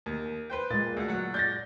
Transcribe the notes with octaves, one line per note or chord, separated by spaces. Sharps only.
D#2
B4 C5 G5
A#2 G#3 A6
D2 F#5
F#3 F#5
D5 G6 A6 A#6